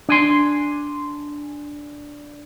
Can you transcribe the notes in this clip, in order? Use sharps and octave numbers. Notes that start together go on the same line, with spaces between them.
D4 G#5 C6